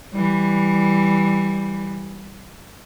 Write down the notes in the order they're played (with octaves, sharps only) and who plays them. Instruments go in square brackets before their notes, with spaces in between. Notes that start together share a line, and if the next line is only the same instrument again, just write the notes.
[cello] E3 G3